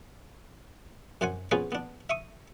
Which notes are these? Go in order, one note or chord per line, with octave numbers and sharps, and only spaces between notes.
F#2 C5 F#5 G#5
B3 C#4 F4 G#4 B4 C5
B3 D4
E5 C#6 D#6